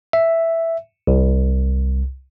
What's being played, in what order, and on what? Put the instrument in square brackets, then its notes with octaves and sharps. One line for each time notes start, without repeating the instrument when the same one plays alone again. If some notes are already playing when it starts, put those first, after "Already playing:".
[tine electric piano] E5
C2